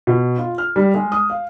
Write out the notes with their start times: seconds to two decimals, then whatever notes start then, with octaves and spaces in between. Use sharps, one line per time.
0.07 B2
0.38 F4
0.58 F6
0.76 G3
0.94 G#3
1.12 D#6
1.30 F5